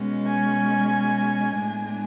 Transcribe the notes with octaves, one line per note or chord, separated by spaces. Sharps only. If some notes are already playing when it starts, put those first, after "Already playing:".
Already playing: B2 G#3 C#4
G#5
A2 G#3 B3 D4